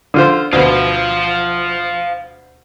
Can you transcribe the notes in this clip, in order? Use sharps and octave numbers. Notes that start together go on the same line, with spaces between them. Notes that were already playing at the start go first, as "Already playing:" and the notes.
D3 F4 C5
D2 B2 F4 C5